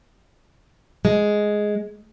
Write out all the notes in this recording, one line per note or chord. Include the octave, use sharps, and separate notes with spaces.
G#3